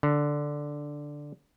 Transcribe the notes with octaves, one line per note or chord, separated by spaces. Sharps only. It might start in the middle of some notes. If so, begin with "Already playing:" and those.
D3